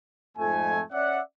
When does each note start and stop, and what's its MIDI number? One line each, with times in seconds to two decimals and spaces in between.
0.37 0.81 41
0.37 0.81 44
0.37 0.81 57
0.37 0.81 80
0.92 1.20 61
0.92 1.20 74
0.92 1.20 76
0.92 1.20 78